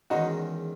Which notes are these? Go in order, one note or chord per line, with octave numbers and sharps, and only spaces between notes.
E2 D#3 G#3 C#4 D#4 F#4